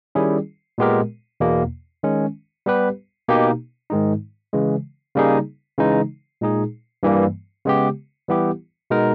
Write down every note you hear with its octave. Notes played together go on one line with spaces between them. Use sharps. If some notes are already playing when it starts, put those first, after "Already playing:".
D#3 G3 C#4 E4 G#4
A#2 G#3 B3 G4 A#4
E2 B2 A#3
D#3 G#3 C#4
G3 B3 G4 B4
B2 A#3 D#4 G4
G#2 D#3 G#3 D#4
C#3 E3 G#3
C#3 G3 A#3 D#4 G#4
C#3 E3 G#3 D#4
A#2 G#3 D#4 G#4
G2 E3 G3 A#3
C#3 G#3 B3 G4
E3 G3 B3 E4 G4
B2 G#3 B3 D#4 A#4